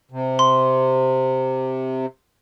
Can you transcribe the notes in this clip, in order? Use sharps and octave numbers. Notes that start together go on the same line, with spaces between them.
C3
C6